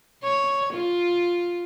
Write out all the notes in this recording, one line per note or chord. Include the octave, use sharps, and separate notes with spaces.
C#5
F4